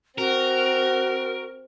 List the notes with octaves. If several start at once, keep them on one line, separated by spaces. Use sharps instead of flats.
C4 F#4 A#4